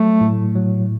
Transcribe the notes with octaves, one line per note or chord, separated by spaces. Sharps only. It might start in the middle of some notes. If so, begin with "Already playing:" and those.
Already playing: F#3 A3
A2
F#3